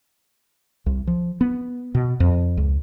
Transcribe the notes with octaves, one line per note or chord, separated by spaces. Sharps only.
C2
F3
B3
B2
F2
C#2